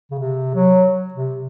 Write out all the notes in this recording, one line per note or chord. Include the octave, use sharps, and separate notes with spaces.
C#3
C3
F#3
C3